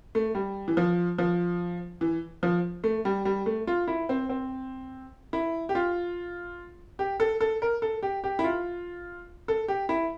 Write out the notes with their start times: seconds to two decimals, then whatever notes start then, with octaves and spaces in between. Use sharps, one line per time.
0.15 A3
0.35 G3
0.68 E3
0.77 F3
1.18 F3
2.01 E3
2.43 F3
2.84 A3
3.05 G3
3.25 G3
3.46 A3
3.67 F4
3.88 E4
4.09 C4
4.29 C4
5.33 E4
5.69 G4
5.75 F4
6.99 G4
7.20 A4
7.41 A4
7.62 A#4
7.82 A4
8.03 G4
8.24 G4
8.39 E4
8.44 F4
9.48 A4
9.68 G4
9.89 E4